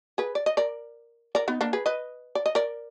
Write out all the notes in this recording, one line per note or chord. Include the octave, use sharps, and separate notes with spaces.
G#4 B4
D5
D#5
A#4 D5
A#4 D5
B3 D#4
A#3 D4
G#4 B4
B4 D#5
D5
D#5
A#4 D5